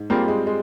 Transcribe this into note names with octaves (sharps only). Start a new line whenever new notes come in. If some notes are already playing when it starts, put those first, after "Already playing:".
Already playing: G#2
G3 A#3 C4 F4 G#4
G#3
G#3